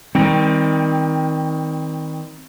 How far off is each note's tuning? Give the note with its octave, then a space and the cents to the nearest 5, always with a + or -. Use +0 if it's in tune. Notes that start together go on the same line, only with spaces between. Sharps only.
D#3 +25 G3 +35 C4 +0